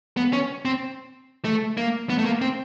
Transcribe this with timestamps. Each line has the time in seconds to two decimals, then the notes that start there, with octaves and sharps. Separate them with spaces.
0.17 B3
0.33 C#4
0.65 C4
1.45 A3
1.77 A#3
2.10 B3
2.18 A3
2.25 A#3
2.41 C4